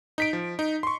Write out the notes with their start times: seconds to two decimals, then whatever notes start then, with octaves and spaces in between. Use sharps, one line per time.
0.18 D#4 B6 D7
0.33 F3
0.59 D#4
0.83 C6 C#6